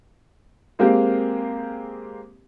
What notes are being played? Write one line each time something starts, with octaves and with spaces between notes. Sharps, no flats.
G#3 A#3 C4 G4 F5